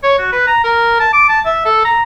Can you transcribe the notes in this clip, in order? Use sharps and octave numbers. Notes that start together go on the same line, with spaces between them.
C#5
F#4
B4
A#5
A#4
A5
D6
A5
E5
A4
A#5